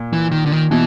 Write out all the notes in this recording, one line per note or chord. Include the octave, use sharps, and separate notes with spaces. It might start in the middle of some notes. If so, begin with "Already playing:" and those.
Already playing: A#2
E3
D#3
D3
D#3
B2 E3